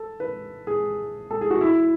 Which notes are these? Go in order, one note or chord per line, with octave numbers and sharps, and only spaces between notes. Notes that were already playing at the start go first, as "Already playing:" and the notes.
Already playing: A4
B4
G#4
A4
G#4
F#4
E4